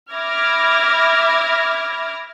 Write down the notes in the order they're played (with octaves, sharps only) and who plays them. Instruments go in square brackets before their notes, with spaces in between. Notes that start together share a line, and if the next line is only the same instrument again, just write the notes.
[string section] E5 B5 D6 F6 G#6 A#6